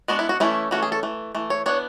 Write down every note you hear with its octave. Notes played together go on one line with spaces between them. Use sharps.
G#3 B3 D4 F#4
E4
F#4
E3 A3 C#4 E4
E3 A3 C#4 F#4
G#4
A4
E3 A3
E3 A3
C#5
E3 B3 D4 C#5